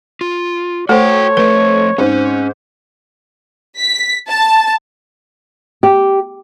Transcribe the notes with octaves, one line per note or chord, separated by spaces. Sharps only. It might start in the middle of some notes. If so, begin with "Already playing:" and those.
F4
A3 F#4 A4 C5 C#5 G5
F3 A3 B4
G#2 C4 C#4
B6
A5
G4